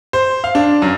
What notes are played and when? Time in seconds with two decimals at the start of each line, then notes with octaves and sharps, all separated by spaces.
0.13 C5
0.44 F5
0.55 D4
0.82 F#2